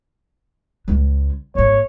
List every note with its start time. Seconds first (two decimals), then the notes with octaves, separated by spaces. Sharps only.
0.88 C#2 G#3
1.55 G#1 A#3 C#5